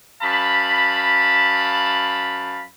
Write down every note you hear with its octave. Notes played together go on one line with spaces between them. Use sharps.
F#2 F5 A5 B5